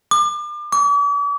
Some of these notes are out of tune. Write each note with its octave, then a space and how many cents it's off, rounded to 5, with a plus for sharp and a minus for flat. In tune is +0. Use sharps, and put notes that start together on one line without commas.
D6 +35
D6 -45